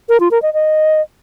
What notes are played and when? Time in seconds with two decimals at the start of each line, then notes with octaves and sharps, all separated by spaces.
0.09 A#4
0.20 F4
0.31 A#4
0.42 D#5
0.54 D#5